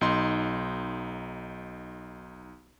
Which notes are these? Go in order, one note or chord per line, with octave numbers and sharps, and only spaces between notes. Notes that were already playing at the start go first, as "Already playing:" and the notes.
B1 D#4 C6